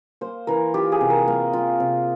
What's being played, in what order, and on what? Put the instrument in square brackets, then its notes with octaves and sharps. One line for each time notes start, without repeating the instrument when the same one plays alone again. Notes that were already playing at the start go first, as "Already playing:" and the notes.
[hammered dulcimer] A#3 [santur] C5
[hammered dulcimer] E3 [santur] A#4
[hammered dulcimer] F4 [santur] G4
[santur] G#4
[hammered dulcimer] C3
[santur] A#4
[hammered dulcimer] A#3
F4
C3